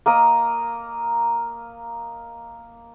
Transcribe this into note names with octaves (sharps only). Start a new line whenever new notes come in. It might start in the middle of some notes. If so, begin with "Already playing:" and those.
A#3 A#4 D#5